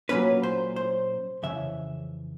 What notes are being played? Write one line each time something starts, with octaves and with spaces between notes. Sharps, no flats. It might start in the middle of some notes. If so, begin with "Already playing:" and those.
A#2 F#3 A#3 C#4 B4
C5
C5
F2 C#3 E3 E5